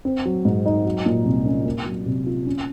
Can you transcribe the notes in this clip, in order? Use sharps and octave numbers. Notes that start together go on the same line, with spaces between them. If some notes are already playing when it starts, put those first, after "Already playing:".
C4
F#3
G#2
D#4
F#3
A#2
C2
C#4
A#3
F#3
C3
F4
C#4